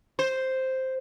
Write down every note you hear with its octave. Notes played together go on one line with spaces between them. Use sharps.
C5